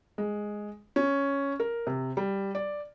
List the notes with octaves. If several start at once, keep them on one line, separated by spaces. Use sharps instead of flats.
G#3
C#4
A#4
C3
G3
D5